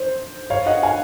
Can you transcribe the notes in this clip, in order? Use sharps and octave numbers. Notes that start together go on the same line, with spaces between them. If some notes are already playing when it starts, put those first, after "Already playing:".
Already playing: C5
C#5 F5
D#5 F#5
F5 G#5